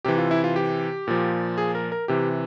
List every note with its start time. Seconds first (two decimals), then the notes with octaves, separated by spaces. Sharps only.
0.05 C3 E3 G4
0.18 F4
0.31 E4
0.44 F4
0.56 G4
1.08 A#2 F3
1.58 G#4
1.75 A#4
1.92 A#4
2.08 C3 E3 G4